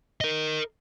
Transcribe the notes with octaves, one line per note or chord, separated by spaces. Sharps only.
A#4 D#5